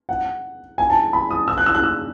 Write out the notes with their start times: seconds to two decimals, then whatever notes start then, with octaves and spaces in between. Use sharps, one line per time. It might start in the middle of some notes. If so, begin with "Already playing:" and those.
0.09 F#5
0.78 G#5
0.90 A5
1.13 B5
1.30 D#6
1.48 E6
1.58 F#6
1.66 E6
1.75 F#6
1.84 E6